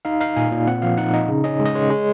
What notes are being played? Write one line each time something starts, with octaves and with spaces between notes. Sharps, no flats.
D#4 F5
D#4 F5
A#2 G#5
A#2
C4 F#5
F3 F5
D#4 F#5
D#4 D#5
C#3
C#4 D#5
G#3
D#5
G#3 C#5
G#3